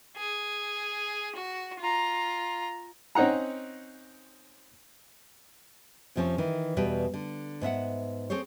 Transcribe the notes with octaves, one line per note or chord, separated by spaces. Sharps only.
G#4
F#4
F4 A#5
C4 C#4 D#4 F#5 A#5
F2 C3 F3 C4 C#4
D#3 E3
E2 B2 G3 B4 G5
D3
G#2 B3 E5 F#5
C4 G#4 A4 C5 C#5